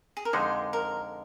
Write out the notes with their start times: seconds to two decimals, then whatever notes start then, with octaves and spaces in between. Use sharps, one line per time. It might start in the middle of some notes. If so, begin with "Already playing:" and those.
0.17 G#4
0.25 A#4
0.33 F2 D3 G#3 D#4 C5
0.73 A#4